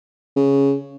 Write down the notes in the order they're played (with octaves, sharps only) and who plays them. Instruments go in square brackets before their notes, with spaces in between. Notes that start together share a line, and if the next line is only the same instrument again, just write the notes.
[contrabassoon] C#3